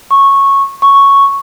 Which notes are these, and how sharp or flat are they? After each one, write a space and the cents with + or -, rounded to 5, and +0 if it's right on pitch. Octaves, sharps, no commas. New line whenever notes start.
C#6 -10
C#6 +0